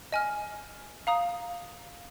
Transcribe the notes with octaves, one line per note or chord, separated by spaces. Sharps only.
D#5 G#5 F6
F5 A#5 D#6